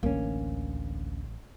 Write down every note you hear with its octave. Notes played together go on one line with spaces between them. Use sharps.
A1 D2 E3 A#3 C#4